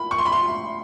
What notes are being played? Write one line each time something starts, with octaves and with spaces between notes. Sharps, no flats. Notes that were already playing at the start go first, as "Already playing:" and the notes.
Already playing: B5
C#6
C6
B5
C6